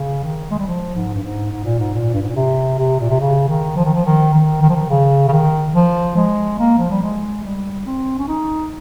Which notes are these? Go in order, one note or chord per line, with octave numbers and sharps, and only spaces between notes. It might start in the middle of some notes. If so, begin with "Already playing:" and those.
Already playing: C#3
D#3
G#3
G3
F3
G#2
G2
G#2
G#2
A#2
G#2
A#2
G2
G#2
A#2
C3
C3
A#2
C3
C#3
D#3
F3
D#3
F3
D#3
D#3
D#3
F3
D#3
C#3
C#3
D#3
F3
G#3
A#3
F3
G3
G#3
G3
C4
C#4
D#4